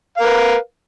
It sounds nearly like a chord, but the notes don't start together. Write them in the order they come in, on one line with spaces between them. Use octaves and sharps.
F5 A#4 B4